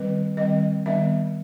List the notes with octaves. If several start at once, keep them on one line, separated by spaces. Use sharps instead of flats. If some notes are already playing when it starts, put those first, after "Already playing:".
Already playing: D#3 G3 C4 B4
D#3 G3 C4 D#5
D#3 G3 B3 D4 E5